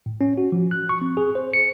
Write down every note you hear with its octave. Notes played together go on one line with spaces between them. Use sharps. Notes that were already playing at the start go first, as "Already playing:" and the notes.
A2
C#4
F#4
F3
F#6
C#6
C4
G#4
C5
C#7